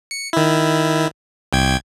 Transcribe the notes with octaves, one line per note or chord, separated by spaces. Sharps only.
C#7
D#3 E4
C2 G5 G#6